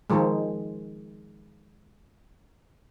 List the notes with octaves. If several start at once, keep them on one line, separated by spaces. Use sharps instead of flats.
D#3 F3 G#3